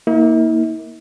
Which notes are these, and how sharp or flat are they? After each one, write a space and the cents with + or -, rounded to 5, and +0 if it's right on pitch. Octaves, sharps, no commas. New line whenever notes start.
A#3 +0 E4 -45